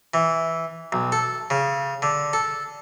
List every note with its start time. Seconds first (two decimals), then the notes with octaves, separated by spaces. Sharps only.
0.14 E3
0.92 B1
1.12 A4
1.50 C#3
2.02 D3
2.33 A4